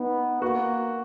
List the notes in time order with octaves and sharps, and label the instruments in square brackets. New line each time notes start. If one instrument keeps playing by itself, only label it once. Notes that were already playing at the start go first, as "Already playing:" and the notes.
Already playing: [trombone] B3 [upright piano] D#4
[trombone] A#3 [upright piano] F#4